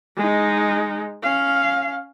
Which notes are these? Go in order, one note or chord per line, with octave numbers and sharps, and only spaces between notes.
G#3 D#4
C#4 F5